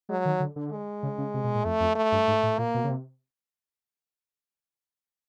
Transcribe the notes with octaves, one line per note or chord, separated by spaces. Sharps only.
F#3 G#3
D#3
D3
D3
G#3
C#3
C#3
C3
B2
A#2
F2 A3
F2
A3
G2
G#2
A2
A#2 A#3
B2
C#3
C3